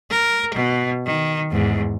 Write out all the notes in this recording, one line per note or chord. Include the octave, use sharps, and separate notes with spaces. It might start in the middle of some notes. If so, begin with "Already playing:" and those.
A#4
B2
D#3
E2 G#2